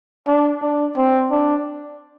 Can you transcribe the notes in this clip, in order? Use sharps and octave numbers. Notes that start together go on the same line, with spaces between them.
D4
D4
C4
D4